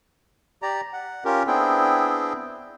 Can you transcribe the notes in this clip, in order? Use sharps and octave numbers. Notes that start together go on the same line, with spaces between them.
G4 D5 A#5
F#5
C#4 F4 G4 A#4
B3 C4 D4 E4 G#4 G5